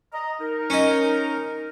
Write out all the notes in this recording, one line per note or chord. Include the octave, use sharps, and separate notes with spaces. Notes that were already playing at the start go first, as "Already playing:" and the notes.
D#5 A#5
D#4 A#4
C#4 D#5